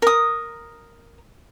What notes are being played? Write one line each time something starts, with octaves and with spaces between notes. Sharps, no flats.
A#4 D#6